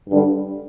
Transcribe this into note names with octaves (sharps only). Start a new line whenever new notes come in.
G2 D3 G3 D4